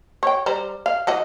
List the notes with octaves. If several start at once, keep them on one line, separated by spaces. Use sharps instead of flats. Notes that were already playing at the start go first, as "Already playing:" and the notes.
C#5 G5
G3 C5 A#5
F5
E3 F#4 D#5